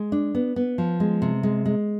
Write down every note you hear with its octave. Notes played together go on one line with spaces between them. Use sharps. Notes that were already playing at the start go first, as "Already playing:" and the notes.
Already playing: G#3
D4
B3
B3
F3
G#3
C3
G#3
G#3